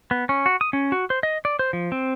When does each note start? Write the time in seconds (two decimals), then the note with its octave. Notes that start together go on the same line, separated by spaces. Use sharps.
0.11 B3
0.29 C#4
0.46 F#4
0.61 D#6
0.73 C#4
0.92 F#4
1.10 C5
1.23 D#5
1.45 D5
1.59 C5
1.73 F3
1.92 C4